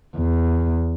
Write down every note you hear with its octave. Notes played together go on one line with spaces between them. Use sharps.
E2